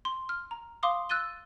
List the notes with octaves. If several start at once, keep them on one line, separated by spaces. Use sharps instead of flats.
C6
F6
A#5
F5 C6 D6 D#6
E6 F#6 A6 D#7 G7